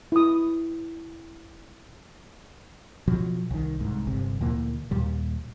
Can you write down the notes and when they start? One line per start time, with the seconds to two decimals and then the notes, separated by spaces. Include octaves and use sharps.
0.12 E4 D#6
3.07 B2 F3 F#3
3.51 C2 D#3
3.80 C2 G#2
4.07 G1 C3
4.41 D2 A#2 E3 A#3
4.91 D#2 A#2 G3